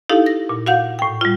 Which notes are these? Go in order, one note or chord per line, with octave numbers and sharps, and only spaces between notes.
D#4 E4 G4 A4 F5
A#6
A#2
F#4 F5 F#5 G6
A2 G5
G3 F4